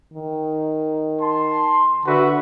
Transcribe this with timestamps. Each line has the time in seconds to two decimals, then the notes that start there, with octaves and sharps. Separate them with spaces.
0.13 D#3
1.21 A5 C6
2.06 D3 F#4 B4 E5